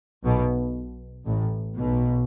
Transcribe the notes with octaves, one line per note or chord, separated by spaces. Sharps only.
B1 B2
A1 A2
B1 B2